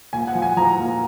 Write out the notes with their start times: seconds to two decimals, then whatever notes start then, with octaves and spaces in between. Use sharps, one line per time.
0.13 A#2 G#5
0.27 F#5
0.35 F3
0.42 G#5
0.57 F3 A#5
0.79 A#2